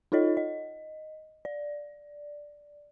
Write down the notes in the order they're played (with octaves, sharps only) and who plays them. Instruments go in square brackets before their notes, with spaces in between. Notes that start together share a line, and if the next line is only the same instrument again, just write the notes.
[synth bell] D#4 F4 A4 C#5 D#5
D#5
D5